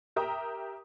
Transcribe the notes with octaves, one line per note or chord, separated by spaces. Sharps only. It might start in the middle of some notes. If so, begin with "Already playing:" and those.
G4 A#4 E5 G5 A#5 D#6